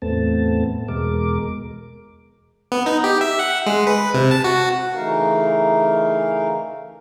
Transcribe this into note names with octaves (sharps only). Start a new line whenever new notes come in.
E2 A2 A3 B3 C4 A5
E2 B2 G#3 A#4 D6
B3
D#4
G4
E5
F#5
G#3
B4
C3
A5
F#4
C#3 E3 A3 D#4 A#4 F5